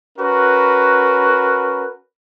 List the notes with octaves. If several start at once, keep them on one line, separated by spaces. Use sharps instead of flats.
C#4 F#4 A#4 B4